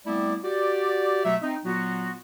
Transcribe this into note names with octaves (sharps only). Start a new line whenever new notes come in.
G3 A3 B3 C4 E4 D5
F#4 G4 D5
B2 F#3 A3 E5
C4 D#4
A#2 F#3 B3 F4 F#4